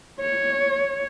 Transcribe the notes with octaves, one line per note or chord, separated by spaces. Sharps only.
C#5